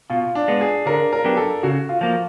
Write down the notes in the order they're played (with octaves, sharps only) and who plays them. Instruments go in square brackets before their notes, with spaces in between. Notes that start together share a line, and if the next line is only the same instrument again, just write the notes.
[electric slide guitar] B2 [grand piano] F4
[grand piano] D4
[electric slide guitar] G#3 B3
[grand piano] G#4
[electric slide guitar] D3 [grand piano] A#4
[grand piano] A#4
[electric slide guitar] F#3 B3 D4 G4
[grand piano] A4
[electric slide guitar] C#3 [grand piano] F#4
[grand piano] F4
[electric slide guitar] F3 A#3